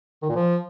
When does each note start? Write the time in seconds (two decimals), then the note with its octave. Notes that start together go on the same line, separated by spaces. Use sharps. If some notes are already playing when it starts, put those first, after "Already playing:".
0.22 D#3
0.29 A#2
0.36 F3